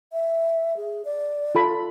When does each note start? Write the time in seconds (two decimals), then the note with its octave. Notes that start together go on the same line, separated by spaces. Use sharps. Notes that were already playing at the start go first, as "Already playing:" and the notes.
0.12 E5
0.77 G#4
1.05 D5
1.55 F4 A4 B5